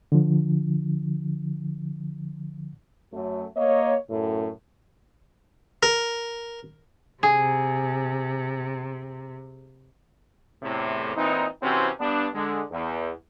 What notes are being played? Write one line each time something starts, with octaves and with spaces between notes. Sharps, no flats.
D3 F3
F#2 F#3 A3
A#3 C#5 D#5
F#2 A2
A#4
C3 G#4
E2 A2 C3
A#2 E3 C4 D#4
C3 E3 C4 C#4 E4 F#4
G2 G3 B3 D4
D3 G#3
E2